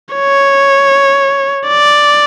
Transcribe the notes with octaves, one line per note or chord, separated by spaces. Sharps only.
C#5
D5